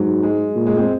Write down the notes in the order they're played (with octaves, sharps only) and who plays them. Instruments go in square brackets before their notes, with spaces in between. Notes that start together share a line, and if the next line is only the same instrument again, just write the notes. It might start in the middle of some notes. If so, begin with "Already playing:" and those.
Already playing: [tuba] G#2 [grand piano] F#3
[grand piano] G#3
[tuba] A#2
[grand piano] G#3
G#3 C4